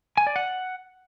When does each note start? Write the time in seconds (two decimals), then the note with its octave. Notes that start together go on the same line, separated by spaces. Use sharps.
0.17 G#5
0.27 D5
0.36 F#5